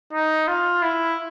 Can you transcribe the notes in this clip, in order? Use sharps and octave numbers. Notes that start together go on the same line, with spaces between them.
D#4
F4
E4